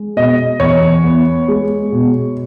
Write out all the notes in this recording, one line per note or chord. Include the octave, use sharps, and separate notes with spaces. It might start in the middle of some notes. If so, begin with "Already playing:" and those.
Already playing: G#3
B2 D#5
E2 C#5
B3
G#3
B2